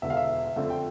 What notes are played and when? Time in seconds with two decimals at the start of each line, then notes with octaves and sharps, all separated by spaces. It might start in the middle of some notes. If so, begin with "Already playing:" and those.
0.02 E1 E2 D3 E5
0.10 F5
0.17 E5
0.56 F2 D3 A3 C4
0.70 G5